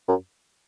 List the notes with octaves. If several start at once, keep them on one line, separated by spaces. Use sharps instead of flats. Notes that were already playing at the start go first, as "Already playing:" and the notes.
F#2